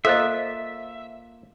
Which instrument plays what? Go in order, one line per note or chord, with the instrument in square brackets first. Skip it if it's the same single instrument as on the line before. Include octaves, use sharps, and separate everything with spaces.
[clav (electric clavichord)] A#3 F4 [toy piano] A4 C5 D#5 [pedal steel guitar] E5